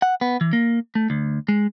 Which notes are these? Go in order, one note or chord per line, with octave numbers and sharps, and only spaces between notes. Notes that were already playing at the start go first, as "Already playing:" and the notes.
F#5
B3
E3
A#3
A3
D2
G#3